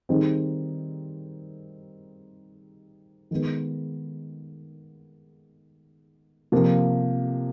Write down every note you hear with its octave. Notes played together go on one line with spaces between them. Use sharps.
D#3 G3 C4 D#4 G#4
D#3 G#3 B3
C3 F3 A#3